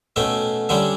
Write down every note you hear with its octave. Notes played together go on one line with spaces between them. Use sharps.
B2 A3 C#4 E5 G5
D3 G3 C#4 E5 G5